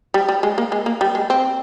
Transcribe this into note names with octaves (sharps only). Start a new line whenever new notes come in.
G3
G3
G#3
A#3
G#3
A#3
G3
G#3
C4